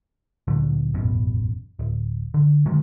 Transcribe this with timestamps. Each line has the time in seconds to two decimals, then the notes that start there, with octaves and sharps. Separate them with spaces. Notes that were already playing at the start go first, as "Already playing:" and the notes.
0.47 D2 A#2 D3 F#3
0.94 E1 A1 F#2 B2
1.79 D1
2.34 D3
2.66 D3 D#3 F#3 G#3